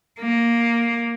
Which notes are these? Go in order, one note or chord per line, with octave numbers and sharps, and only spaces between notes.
A#3